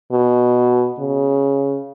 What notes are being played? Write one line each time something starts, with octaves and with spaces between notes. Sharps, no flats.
B2
C#3